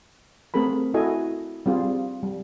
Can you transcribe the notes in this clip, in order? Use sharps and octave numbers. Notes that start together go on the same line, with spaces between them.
A3 C4 G#4 A#4 B5
E4 F#4 A4 D#5 G#5
G3 C4 F4 G#4
G3